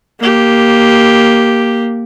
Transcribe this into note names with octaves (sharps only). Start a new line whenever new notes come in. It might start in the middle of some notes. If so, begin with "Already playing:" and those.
A#3 G4